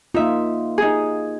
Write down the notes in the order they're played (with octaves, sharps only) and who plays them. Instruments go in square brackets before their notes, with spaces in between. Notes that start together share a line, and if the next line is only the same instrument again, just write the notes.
[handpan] A#3 F4 [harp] D#4 E5
[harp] D#4 G#4